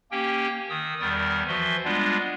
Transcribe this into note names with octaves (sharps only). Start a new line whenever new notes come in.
A#3 C#4 G4 G5
D#3 D#6 E6
E2 D#3 G3 A#4 A6
E3 F3 F#4 E5 C6
G3 G#3 B3 D4 F4